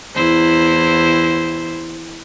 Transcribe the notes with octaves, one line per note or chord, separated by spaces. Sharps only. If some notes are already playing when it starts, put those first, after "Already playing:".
E2 E4 C5